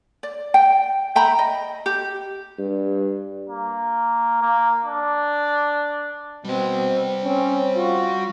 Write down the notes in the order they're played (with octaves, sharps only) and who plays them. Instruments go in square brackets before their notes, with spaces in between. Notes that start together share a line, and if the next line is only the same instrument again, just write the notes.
[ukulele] D5
G5
E5 G5 A#5 B5
D#5
G4
[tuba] G2
[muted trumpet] A#3
A#3
D4
[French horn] B2 [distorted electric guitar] G3 C6 [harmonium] C4
[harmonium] C4 [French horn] C#4
[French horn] F4 [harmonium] F#4